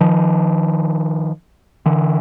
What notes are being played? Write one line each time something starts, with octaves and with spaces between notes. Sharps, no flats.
D#3 F3
D3 E3